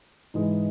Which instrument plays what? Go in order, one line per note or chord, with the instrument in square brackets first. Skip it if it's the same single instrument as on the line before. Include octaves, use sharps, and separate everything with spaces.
[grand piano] G#2 E3 G#3